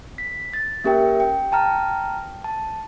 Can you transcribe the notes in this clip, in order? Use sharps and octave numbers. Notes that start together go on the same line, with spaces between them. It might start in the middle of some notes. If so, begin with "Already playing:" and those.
B6
A6
A#3 C#4 G4 A#4 E5 G5
G5
G5 A5 A#5 F6
A5